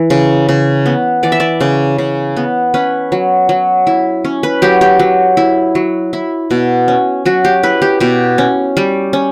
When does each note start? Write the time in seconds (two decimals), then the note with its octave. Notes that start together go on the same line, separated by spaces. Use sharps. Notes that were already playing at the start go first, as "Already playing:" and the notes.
Already playing: E3
0.10 C#3
0.49 C#3
0.86 B3
1.23 E3 D5
1.32 E5
1.40 D5
1.61 C#3
1.98 C#3
2.36 B3
2.74 C#4 B4
3.12 F#3
3.49 F#3
3.87 E4
4.25 C#4
4.43 B4
4.62 F#3 G4
4.81 G4
4.99 F#3
5.37 E4
5.75 F#3
6.13 E4
6.51 B2
6.88 C#4
7.26 F#3 F#4
7.45 G4
7.63 E4 B4
7.82 G4
8.00 B2 G4
8.38 C#4
8.77 G3
9.13 C#4